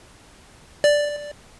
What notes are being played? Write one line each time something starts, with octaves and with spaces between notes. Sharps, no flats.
D5